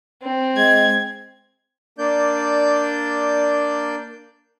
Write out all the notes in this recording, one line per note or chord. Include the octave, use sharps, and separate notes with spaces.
C4
G#3 G#6
A#3 D4 D5 G6